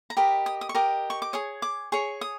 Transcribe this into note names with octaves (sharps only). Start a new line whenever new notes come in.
A#5
G4 A#4 D#5 B5
D#6
D#6
C#6
G4 A#4 D#5 D6
C#6
D6
G#4 C#5 D#6
D6
G#4 C#5 C#6
D#6